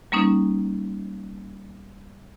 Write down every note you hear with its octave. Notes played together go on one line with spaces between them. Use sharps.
G3 A#3 C#4 D#4